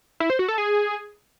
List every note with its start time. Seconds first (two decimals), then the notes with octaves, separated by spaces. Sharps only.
0.20 E4
0.30 C5
0.39 F#4
0.48 A4
0.58 G#4